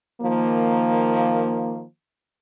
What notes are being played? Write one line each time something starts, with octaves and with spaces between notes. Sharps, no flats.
D#3 F3 A#3